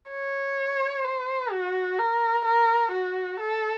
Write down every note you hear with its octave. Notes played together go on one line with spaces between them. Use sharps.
C#5
C5
F#4
A#4
A#4
F#4
A4